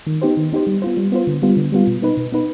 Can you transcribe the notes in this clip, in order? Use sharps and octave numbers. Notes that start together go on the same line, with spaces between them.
D#3
B3 D#4 G4 C5
D#3
B3 D#4 G4 C5
G3
B3 F4 C5
G3
B3 F4 C5
D3
G3 B3 F4
D3
G3 B3 F4
B2
B3 D#4 B4
B2
B3 D#4 B4